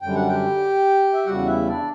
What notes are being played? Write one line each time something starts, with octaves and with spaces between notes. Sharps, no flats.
F#2 D3 G3 G5
F#5
G4 G5
E5
E2 C#3 G3 F#4 F#5
E4 E5
D4 D5